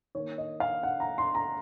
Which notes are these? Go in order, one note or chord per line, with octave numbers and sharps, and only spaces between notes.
D#3 A#3 C#5
D#5
F5
F#5
A#5
C6
A#5